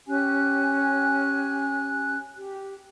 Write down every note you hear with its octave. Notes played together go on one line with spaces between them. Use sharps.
C#4 G4 G#5 F#6
G4